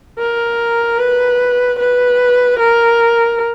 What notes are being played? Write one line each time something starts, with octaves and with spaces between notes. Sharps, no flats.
A#4
B4
B4
A#4